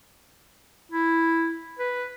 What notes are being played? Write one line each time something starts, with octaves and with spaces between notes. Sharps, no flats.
E4
B4